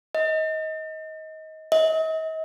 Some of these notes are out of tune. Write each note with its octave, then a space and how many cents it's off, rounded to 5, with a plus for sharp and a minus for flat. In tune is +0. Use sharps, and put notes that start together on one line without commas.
D#5 +20
D#5 +45